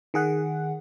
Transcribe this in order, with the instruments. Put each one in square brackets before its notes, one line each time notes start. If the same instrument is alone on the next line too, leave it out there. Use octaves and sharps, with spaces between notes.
[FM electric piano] D#3 G#4 F#5